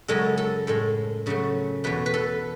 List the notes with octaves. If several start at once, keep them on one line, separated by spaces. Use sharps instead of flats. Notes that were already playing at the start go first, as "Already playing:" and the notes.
F#2 C#3 G#3 A4
A4
A2 G#3 A4
F#2 C#3 F#3 A3
E2 B2 A3 B4
B4
A4